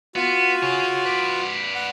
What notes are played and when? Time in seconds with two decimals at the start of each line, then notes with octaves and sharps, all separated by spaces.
0.15 B3 F4 F#4
0.63 G#4 C#5
1.06 B4 D5
1.75 F#5